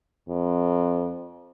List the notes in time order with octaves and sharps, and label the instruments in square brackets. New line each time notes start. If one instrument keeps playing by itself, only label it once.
[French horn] F2